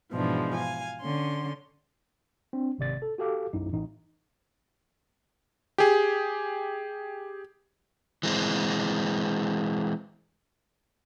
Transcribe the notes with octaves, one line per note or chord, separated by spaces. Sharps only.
G#2 B2 E3 F3 G#3 D4
F5 G#5
D3 C#4 C6
C4 D4
G#1 C3 D5 A6
A4
F#4 G4 A4 F5 D6
B1 F#2 D#4 E4
A1 D#4
G4 G#4
E3 G#3 C4